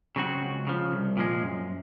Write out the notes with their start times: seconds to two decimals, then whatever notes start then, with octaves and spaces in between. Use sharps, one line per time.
0.16 C#3 F#3 C4 F#4
0.41 C#2
0.67 C#3 F3
0.92 C2
1.17 A#2 F3 G#3
1.42 F#2